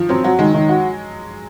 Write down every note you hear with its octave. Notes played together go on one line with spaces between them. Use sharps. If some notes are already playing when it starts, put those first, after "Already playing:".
Already playing: D#3 F3
F#3 C4
F#3 F#4
D#3 G#3
D#3
F#4